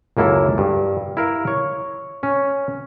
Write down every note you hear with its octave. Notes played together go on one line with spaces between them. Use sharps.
C#2 F#2 A#3 E4 A4
G2
E4 A#4 F5
C#5
C#4